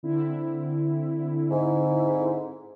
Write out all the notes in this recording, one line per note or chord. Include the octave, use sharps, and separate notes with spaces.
D3 C4 E4
G#2